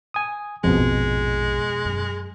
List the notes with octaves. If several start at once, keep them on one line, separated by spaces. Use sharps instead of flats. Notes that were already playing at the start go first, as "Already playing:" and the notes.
G#5 D#6
A#1 F2 G#2 B2 G#3
F#2